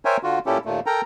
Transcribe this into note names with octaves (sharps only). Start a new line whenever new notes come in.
A#4 C5 C#5 E5 G5 G#5
D3 F4 F#4
A#2 C#4 E4 G4 A4
D#2 A#2 A3
A4 A#4 G5 A#5